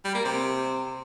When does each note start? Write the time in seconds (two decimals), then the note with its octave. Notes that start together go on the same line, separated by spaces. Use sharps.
0.05 G3
0.15 A#3
0.25 C3